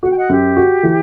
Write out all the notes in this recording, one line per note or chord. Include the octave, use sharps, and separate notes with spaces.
F#4 F#5
G5
D#5 F#5
F#2 G4
F#4
E3